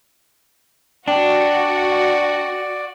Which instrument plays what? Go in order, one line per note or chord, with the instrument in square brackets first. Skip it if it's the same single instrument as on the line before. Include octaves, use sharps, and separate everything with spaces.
[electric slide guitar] D4 [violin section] F#4 [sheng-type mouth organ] D5 [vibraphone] G5